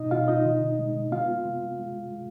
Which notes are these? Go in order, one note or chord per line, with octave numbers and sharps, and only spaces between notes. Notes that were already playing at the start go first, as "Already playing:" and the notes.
Already playing: B2 D#4 D#5
B2 F4 F5
D#4 D#5
D3
G#3
B3 F4 F5
C3
G#3
G#3